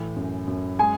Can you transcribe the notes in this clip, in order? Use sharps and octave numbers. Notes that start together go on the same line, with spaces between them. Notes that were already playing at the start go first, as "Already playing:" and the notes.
Already playing: A2 E3
F#2
F#2
G#3 G#4 G#5